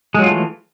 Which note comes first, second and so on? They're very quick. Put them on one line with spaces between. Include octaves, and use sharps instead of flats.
G#3 F#3 F4 A3 E3